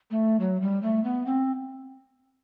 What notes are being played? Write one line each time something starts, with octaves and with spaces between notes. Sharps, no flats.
A3
F#3
G3
A3
B3
C4